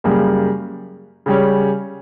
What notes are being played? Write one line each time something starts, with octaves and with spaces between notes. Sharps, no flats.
F#2 C#3 G3 A#3
C#3 G3 C#4